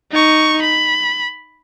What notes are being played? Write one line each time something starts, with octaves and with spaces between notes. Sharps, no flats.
D#4 C#6
B5